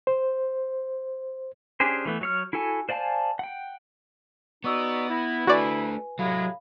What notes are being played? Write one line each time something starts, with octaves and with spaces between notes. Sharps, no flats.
C5
C#4 D4 G4 G#4 C5
E3 A3 B3
F#3 C#5 F6
E4 F#4 A4 G#5
C5 D5 F5 G#5 A5
F#5 G5
B3 D#4 F#4 D5 C#6 D#6 E6
E4 B4 A#6
A3 D4 F#4 B4 D5 G#5
A2 C3 F#3 G#3 F5 B5